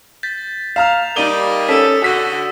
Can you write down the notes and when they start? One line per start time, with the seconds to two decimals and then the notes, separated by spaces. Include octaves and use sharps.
0.23 G6 A6 B6
0.76 F5 A#5 F6 E7 F7
1.16 G3 A#3 D#4 D5 D#6 D#7 F#7 G7
1.69 C#4 A4 B6
2.04 D3 F#4 E6 B6